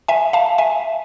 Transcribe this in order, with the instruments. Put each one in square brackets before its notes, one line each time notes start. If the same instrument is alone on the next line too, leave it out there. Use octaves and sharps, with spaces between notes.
[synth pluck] E5 G#5
F5 A5
E5 G#5